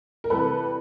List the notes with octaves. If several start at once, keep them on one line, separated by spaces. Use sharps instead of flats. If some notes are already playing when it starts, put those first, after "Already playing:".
A#4
C3 E3 G3 A4 B4